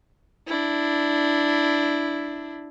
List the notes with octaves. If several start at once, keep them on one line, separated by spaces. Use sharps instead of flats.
D4 E4